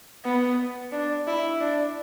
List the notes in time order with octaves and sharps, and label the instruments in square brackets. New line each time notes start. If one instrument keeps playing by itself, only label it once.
[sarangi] B3
D4
E4
D4